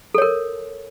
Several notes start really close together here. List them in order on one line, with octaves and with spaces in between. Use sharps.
A4 C#5 A#4